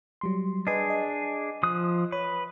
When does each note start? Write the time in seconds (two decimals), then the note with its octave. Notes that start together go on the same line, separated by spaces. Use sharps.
0.21 F#3 G3 C6
0.67 D4 G#4 B4 D#5
0.90 D#5
1.63 F3 D#6 F#6
2.12 B4 C#5